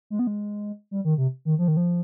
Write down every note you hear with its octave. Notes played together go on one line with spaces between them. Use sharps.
G#3
B3
G#3
G3
D#3
C3
D#3
F3
D#3
F3